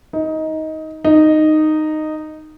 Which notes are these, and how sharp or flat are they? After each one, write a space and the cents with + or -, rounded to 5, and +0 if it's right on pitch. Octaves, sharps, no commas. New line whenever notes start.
D#4 +15
D#4 -10